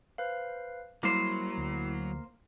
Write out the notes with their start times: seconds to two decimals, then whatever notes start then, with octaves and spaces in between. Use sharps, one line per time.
0.18 B4 C5 F5
1.03 F#3 G3 A#3 E4 C5
1.58 D2